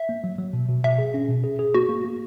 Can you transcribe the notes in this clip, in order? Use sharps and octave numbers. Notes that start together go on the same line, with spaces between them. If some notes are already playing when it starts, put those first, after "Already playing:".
Already playing: E5
A#3
F#3
F#3
B2
B2
B2 E5
G#4
C#4
B2
G#4
G#4
A#3 F#4
A#3
A#3